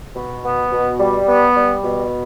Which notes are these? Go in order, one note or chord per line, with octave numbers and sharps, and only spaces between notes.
B2
B3
B2
G3
B3
G3
B2